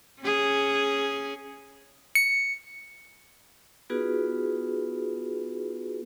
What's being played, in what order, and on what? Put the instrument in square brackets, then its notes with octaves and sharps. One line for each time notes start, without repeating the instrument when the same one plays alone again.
[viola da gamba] C#4 G#4
[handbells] C#7
[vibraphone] B3 D#4 F4 F#4 G#4 B4